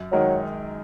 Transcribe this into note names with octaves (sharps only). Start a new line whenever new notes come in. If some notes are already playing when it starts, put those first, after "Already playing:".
Already playing: F#2
D#3 F#3 G#3 D#4 A#4